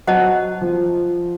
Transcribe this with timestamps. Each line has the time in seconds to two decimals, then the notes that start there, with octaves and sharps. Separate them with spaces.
0.07 F#3 C5 D#5 F#5 A5
0.62 F3